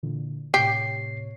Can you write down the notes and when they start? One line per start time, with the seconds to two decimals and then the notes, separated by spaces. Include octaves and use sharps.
0.03 A#2 D3 E3
0.54 A2 C3 G4 C#5 C7